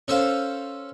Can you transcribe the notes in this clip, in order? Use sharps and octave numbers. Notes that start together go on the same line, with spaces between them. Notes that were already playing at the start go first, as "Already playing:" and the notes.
C#4 A4 C5 F5